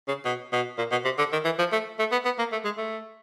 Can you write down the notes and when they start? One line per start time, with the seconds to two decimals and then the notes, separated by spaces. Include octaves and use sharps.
0.08 C#3
0.25 B2
0.52 B2
0.78 A#2
0.91 B2
1.05 C3
1.18 D3
1.32 D#3
1.45 E3
1.59 F3
1.72 A3
1.99 A3
2.12 B3
2.25 B3
2.39 A#3
2.52 A3
2.65 G#3
2.78 A3